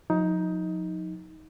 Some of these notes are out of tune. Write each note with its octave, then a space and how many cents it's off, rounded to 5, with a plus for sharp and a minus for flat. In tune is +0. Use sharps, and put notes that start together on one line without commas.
F3 +45 D#4 +15